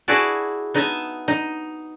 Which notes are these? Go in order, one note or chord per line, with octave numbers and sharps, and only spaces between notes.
E4 F#4 G#4 B4 D5 A5
B3 D#4 D#5 E5 A5
D#4